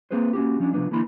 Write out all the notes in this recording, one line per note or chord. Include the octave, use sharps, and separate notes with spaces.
A#3 C4 G#4 B4 C5
A#3 C#4 F#4 G4
F3 C#4 D4
C3 F3 A3 B3 D4
D3 E3 A#3 E4 B5 C6